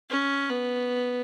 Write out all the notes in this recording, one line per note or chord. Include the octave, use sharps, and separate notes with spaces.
C#4
B3